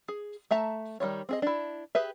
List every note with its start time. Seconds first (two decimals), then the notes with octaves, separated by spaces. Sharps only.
0.08 G#4
0.51 A3 E5 A5 A#5
1.00 D#3 G3 F4 C#5
1.29 C4 G#4 D#5
1.42 D4 E4
1.95 G4 G#4 B4 E5